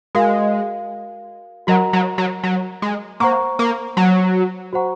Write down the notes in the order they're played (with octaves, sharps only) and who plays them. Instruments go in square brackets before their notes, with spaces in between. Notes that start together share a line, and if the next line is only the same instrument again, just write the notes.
[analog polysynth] G#3 [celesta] F#4 A#4 F5
[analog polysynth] F#3 [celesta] F#4 A#4 D#5 F#5 A#5
[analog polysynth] F#3
F#3
F#3
G#3
[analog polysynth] A#3 [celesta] C5 F#5 A#5 C#6
[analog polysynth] A#3
F#3
[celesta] F#4 C5 F#5 A#5 C#6